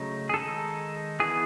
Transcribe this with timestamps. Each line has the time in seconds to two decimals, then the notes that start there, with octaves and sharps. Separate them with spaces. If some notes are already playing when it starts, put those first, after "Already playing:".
Already playing: C#3 F#3 A3 D#4
0.29 G#4
0.34 D#3 G#3 D#4 A4
1.20 E3 B3 E4 G#4